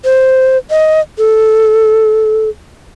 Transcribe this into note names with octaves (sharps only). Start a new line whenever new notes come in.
C5
D#5
A4